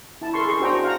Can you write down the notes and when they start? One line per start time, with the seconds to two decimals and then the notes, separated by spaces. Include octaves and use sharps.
0.21 E4 A5
0.34 A4 A#4 C6 C#6
0.45 G#4 C#6
0.60 D4 F#4 C5 G5 A#5
0.84 F5 F#5 A#5